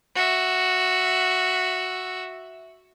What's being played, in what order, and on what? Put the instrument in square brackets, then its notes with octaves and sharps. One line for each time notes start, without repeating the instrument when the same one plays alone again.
[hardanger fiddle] F#4 E5